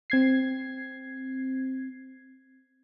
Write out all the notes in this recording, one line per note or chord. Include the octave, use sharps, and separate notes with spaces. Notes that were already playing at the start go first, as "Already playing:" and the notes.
C4 G#6 C7